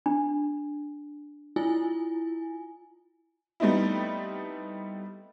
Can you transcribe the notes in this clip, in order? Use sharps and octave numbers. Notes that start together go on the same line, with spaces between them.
D4
E4 F4 G#5
G3 A3 B3 C4 D#4 E4